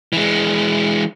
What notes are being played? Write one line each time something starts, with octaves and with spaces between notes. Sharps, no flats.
E3 G#3